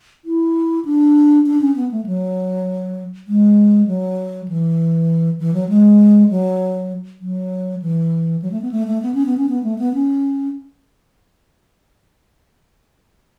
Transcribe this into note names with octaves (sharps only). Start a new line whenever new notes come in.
E4
D4
D4
C#4
B3
A3
F#3
G#3
F#3
E3
E3
F#3
G#3
F#3
F#3
E3
F#3
A3
B3
A3
A3
B3
C#4
B3
C#4
B3
A3
B3
C#4